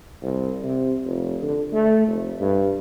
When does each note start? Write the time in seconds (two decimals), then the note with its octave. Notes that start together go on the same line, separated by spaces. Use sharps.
0.22 C2
0.63 C3
1.05 F1
1.42 D3
1.72 A3
2.07 F1
2.41 G2